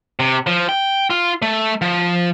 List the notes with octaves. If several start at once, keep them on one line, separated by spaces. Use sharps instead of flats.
C3
F3
G5
F4
A3
F3